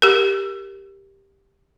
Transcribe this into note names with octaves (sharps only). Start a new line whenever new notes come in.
G4 A#4